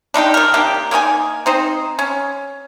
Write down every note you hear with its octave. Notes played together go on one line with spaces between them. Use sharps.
D4 D#4 F4 G4
D#3 A#4
C3 A#3 D4 G4
A#3 D#4 C#5 G#5
C4 D#4 C5
C#4